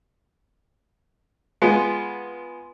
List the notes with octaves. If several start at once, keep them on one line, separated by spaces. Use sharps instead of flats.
G#3 B3 F4